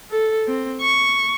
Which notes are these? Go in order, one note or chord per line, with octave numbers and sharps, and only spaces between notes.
A4
C4
C#6